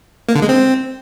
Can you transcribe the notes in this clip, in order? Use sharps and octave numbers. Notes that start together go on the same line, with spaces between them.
A#3
D3
G#3
C4